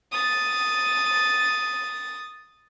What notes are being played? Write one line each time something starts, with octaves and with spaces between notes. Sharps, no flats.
D#6 A6